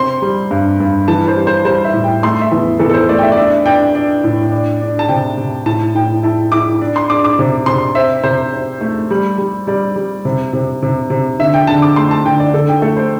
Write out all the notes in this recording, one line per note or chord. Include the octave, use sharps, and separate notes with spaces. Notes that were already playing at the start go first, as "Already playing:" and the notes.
Already playing: C3 C4 C6
G3
G2
G2
E3 A5
C5
G3
C5
G3 C5
E5
A2
G5
A3 C6
E5
E2
E2 A4
A4
C5
A3 D5
G5
E5
D5
D4 E5
D4 G5
D4
A2
D4
D4
A5
C3 G5
C3
A2 A5
A2 G5
E4 A5
E4 D6
D4
C6
D4 D6
D6
C3
C3 C6
C4 E5
C3 C5
C4
A3
G3
G3
G3 D5
G3
C3
C3
C3
C3
D3 E5
G5
D3 A5
D6
A3 C6
A5
D3 G5
D5
D3 A4
G5
A3 A4
C5